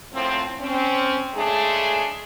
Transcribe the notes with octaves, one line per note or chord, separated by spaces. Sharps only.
F#2 A2 F3 C4
C4 C#4
C#3 G#3 A3 D4 G#4